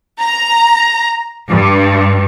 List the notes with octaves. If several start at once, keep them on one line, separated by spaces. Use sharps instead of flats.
A#5
G2